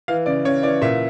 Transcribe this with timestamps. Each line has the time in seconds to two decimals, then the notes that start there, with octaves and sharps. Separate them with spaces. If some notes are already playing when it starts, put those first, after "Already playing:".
0.08 E3 F5
0.26 C#3 D5
0.45 C#3 C#5
0.63 E3 D5
0.82 A#2 E5